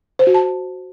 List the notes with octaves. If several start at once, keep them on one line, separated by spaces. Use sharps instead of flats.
C5
F#4
A5